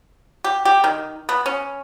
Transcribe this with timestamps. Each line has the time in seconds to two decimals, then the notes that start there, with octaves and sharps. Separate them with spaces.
0.44 G4
0.65 G4
0.84 D#3
1.29 B3
1.46 C#4